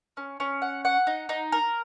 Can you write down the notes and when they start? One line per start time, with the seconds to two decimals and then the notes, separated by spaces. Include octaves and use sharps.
0.17 C#4
0.40 C#4
0.62 F#5
0.85 F#5
1.07 D#4
1.29 D#4
1.52 A#4